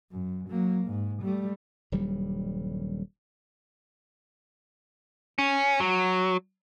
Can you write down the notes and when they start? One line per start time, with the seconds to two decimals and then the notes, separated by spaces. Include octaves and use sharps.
0.11 F#2
0.49 F#3 A#3
0.86 G#2
1.23 G3 A3
1.92 D#1 G2 F#3 G3
5.38 C#4
5.80 F#3